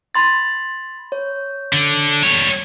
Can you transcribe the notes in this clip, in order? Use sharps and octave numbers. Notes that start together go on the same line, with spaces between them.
B5 C6 A6
C#5
D3
G3 C#5